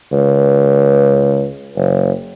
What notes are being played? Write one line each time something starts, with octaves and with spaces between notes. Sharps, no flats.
C#2
F#1